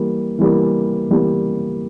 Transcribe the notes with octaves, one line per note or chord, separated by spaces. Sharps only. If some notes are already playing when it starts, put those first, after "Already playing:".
Already playing: E3 G3 A#3
E3 G3 A#3
E3 G3 A#3